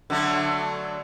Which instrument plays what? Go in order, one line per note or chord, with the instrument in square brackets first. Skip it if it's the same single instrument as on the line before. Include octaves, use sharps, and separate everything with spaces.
[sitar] D3 F#3 A3